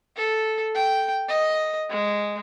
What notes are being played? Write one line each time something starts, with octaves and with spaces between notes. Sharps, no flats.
A4
G5
D#5
G#3